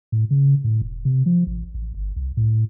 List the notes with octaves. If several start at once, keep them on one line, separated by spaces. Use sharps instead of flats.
A2
C#3
A2
E1
C3
F3
A1
A1
G1
C2
A2